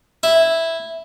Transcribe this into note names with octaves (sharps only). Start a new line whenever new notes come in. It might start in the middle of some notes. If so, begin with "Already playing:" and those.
E4